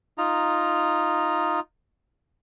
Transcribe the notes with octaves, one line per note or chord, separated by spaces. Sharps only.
D#4 F4 A#5